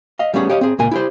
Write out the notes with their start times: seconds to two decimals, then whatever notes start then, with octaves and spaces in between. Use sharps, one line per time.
0.19 D#5 F5
0.34 G3 A3 B3 C#4 G4 G#4
0.50 G4 C#5 D#5 F5
0.61 C4 G#4
0.79 C#2 A#2 A#3 A#4 G#5
0.92 E4 G4 C5